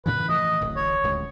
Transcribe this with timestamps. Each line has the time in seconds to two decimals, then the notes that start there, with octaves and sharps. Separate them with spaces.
0.06 A2 C#3 E3 B4
0.29 E3 F3 A3 D#5
0.61 D1 A1 A2
0.76 C#5
1.03 D1 C#2